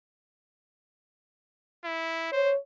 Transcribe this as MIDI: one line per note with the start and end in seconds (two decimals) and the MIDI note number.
1.84 2.30 64
2.32 2.52 72
2.32 2.57 73